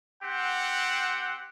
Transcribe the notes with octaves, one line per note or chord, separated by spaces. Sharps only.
C4 G4 F#5